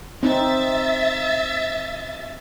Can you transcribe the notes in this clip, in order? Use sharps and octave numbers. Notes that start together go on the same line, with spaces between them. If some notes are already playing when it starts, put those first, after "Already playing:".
C4 D#4 E5 A6